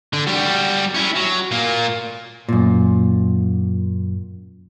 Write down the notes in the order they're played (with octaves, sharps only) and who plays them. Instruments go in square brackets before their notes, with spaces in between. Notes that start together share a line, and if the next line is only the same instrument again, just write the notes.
[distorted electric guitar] D3
G3 F#4
C#4 E4
F#3
A#2 A#3
[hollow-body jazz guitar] F#2 A#2